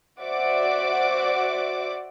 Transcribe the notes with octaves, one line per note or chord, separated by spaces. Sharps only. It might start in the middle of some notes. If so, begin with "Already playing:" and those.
F#4 C5 D5 E5 F#5 D6